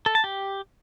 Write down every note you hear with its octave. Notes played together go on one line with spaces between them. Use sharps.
A4
A5
G4